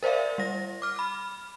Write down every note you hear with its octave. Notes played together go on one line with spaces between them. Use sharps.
A#4 C5 D5 E5 F5
G3 A#6
D6 F6
B5 F6